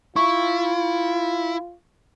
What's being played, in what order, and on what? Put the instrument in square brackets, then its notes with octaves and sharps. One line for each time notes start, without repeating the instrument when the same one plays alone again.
[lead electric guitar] E4 [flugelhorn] F4 [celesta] C#6